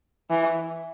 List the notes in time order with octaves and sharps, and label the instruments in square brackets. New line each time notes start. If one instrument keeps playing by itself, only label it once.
[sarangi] E3